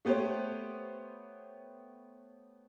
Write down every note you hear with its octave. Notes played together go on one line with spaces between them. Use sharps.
A3 B3 G4 C5 C#5